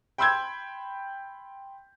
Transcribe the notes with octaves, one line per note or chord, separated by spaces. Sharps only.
G5 B5 C6 E6 G6 G#6